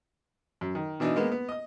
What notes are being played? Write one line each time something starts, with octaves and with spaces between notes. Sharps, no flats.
F#2
D#3
B2 E3 D4 D#4
G#3 A#3 B3
B3
D#5 D#6